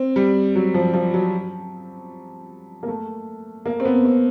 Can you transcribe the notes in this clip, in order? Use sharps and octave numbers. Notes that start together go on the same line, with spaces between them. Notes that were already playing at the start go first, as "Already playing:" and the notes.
Already playing: C4
G3
F#3
F3
F3
F#3
A#3
A3
A#3
C4
B3
C4